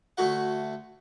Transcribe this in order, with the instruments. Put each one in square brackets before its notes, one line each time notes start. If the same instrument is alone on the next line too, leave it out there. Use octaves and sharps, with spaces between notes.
[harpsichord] D2 A3 F#4 F#5